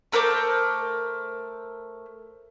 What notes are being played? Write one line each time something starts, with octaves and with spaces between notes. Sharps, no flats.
A3 A#4 C5 D6